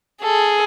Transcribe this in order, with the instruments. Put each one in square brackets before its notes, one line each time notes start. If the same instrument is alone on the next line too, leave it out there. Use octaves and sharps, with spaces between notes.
[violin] G#4 [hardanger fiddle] A4